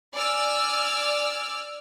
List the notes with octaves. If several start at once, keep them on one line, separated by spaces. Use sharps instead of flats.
D5 G#5 E6 F6